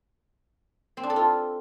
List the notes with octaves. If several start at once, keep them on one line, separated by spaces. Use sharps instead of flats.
C4
D4
A4
F4